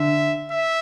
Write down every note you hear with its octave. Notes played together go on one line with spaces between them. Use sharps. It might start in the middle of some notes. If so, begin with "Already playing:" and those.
Already playing: D3 E5
E5